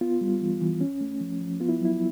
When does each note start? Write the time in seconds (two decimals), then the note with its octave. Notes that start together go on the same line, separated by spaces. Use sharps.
0.01 B3 F4
0.21 G3
0.41 E3
0.61 E3
0.81 C#4
1.01 A3
1.21 F3
1.41 F3
1.60 B3 F4
1.69 E4
1.81 F#3 E4